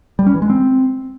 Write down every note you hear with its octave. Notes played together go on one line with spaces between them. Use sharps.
G3
C#4
E3
G#3
C4